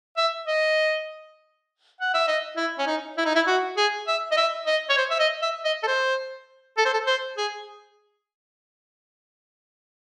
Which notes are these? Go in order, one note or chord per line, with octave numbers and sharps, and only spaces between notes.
E5
D#5
F#5
E5
D#5
E4
C#4
D#4
E4
D#4
E4
F#4
G#4
E5
D#5
E5
D#5
C#5
C5
E5
D#5
E5
D#5
A4
C5
A4
C5
A4
C5
G#4